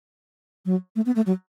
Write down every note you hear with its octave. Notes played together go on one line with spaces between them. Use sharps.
F#3
A3
B3
A3
F#3